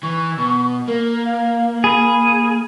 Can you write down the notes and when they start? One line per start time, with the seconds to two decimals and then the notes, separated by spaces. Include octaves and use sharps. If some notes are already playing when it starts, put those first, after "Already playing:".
0.03 E3 C#6
0.38 B2
0.88 A#3 A#4
1.25 F5
1.84 G#4 B5